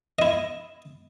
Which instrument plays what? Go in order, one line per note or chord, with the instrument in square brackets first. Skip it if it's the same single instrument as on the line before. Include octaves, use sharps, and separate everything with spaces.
[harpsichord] E4 D#5